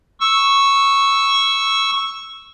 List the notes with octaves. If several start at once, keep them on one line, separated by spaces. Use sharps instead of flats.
C#6 E6